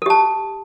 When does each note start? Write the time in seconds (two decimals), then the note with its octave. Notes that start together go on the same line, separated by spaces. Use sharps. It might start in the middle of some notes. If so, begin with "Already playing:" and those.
0.02 A4
0.06 G4
0.10 A5